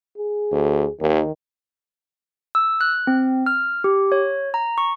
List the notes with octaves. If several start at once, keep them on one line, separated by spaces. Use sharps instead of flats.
G#4
D2
D#2 D#3
E6
F#6
C4
F6
G4
C#5
A#5
C#6